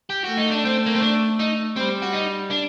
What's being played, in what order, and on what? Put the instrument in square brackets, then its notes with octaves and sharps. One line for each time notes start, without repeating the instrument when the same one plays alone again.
[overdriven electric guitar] G4
[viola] A3 [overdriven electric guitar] F#4
[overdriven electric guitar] D#4
D4
C4
A#3
C4
D4
D#4
[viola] G3 [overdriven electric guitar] C4
[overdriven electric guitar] F#4
D#4
D4